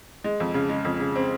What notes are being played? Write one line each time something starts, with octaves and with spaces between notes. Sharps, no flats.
G#3
F2
C#3
G#3
F2
C#3
C4